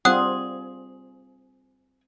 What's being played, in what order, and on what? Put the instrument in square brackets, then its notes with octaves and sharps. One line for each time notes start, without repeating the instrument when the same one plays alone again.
[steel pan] G3 C4 F4 [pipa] G#4 [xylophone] F#5 D#6 F#6